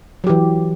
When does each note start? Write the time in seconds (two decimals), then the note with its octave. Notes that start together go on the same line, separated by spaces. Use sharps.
0.24 F#3
0.27 G4
0.29 E3